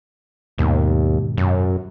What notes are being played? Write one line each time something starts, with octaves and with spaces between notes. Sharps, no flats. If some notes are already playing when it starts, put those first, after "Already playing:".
D#2 G#2 B2 D#3
F#2